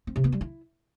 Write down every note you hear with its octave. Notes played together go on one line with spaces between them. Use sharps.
C4
C3
B3
G3
E4